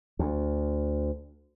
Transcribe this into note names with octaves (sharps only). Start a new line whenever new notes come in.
D2